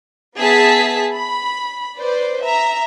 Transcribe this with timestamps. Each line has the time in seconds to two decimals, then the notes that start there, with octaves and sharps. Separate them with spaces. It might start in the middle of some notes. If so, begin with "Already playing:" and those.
0.37 B3 G#4 E5 A5 B6
1.13 B5
1.98 B4 C5 D5
2.43 E5 A#5